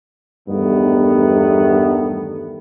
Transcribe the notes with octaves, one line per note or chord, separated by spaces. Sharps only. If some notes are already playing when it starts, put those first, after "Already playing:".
E2 G2 D#3 A3 B3